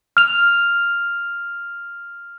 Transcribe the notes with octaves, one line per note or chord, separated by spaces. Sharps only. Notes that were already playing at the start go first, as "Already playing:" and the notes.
F6 F7